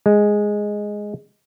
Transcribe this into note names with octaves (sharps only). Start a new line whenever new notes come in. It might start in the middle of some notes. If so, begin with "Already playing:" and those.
G#3